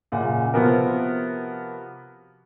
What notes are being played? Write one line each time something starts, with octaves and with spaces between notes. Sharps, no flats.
F#2 A#2 C#3 F#5
C3 F3 B3 F#4 A#4